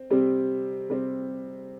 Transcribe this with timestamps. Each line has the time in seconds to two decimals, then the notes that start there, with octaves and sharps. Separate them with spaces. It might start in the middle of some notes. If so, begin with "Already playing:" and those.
Already playing: C4
0.10 C3 G3 C4
0.90 C3 G3 C4